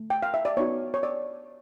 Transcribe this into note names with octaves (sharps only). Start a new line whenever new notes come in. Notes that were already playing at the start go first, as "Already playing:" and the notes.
Already playing: A3
G5
F5
E5
D5
B3 D#4 F#4 C#5
C#5
D5